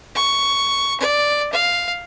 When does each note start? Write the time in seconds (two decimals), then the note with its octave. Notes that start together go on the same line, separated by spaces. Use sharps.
0.15 C#6
1.00 D5
1.52 F5